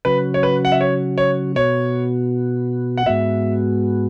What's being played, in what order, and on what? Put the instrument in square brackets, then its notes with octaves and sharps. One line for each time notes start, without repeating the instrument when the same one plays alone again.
[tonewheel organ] C#3 F#3 C#4 F#4 [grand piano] B4
[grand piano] C#5
B4
F#5
E5
C#5
C#5
[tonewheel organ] B2 B3 F#4 [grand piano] C#5
[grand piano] F#5
[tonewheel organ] G#2 G#3 B3 F#4 [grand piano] E5